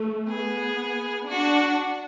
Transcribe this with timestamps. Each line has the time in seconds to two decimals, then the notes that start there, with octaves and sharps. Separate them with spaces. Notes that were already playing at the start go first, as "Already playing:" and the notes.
Already playing: A3
0.28 B3 G#4
1.29 D4 F#4